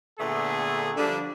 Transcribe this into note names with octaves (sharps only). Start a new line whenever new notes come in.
A#2 D3 A3 B3 G#4
D3 F3 G3 D4